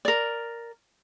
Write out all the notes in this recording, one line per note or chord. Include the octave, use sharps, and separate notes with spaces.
A#4 D5